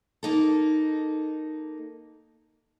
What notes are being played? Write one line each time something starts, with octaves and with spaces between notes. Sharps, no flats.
A#3 D#4 A4